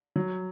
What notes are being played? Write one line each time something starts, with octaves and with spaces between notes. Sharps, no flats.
F#3